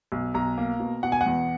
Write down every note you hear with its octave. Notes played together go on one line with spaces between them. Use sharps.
B1
B1 A#5
A#3
B2
B2 F#5
G#5
E2 F#5